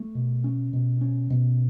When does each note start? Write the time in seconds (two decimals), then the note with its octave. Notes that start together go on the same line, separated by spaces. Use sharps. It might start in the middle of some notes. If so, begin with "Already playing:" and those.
Already playing: A3
0.15 B2
0.44 C#4
0.73 B2
1.01 C#4
1.30 B2